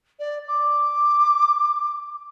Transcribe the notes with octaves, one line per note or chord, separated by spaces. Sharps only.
D5
D6